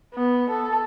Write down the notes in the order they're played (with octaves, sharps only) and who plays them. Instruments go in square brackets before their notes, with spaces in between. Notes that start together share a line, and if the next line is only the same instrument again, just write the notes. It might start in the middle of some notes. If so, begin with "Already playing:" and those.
[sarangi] B3
A4